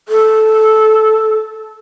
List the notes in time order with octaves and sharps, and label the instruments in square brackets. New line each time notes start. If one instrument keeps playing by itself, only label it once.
[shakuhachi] A4